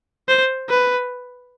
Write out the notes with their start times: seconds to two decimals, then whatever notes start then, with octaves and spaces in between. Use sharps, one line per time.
0.28 C5
0.69 B4